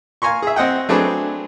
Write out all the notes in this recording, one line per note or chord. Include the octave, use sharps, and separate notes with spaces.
F5 G#5 A#5 C6 C#6
G#4 E5
C4 D#5 F#5 G5
F#3 A3 C4 D4 G#4 B4